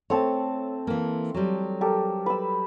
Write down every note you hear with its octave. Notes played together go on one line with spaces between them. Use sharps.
A3 C4 C#5 A5
E3 A#3
F#3 G3
G4 A4 A#4
B4 E6